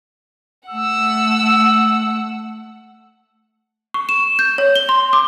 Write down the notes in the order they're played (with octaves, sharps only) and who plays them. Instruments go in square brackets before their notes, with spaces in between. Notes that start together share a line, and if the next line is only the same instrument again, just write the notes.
[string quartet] A3 F#5 [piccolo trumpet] E6
[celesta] C#6
E7
G6
C#5
G7
C6
D6